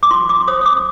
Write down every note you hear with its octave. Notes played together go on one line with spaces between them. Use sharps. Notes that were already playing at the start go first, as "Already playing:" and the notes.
D6
F4 C6
D6
C5 D#6
D#6
D6